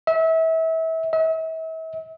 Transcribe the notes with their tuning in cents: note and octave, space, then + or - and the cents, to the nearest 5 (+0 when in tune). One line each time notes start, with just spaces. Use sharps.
E5 -30
E5 -40